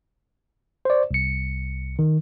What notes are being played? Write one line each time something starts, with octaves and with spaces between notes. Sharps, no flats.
C5 D5
C2 C#7
D#3